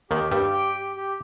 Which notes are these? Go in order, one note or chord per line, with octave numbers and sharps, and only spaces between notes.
D#2 D#3 G4
G2 G3 G4
G5
G4
G4